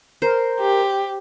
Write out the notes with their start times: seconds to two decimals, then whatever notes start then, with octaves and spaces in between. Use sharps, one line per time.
0.22 A#4 C5
0.61 G4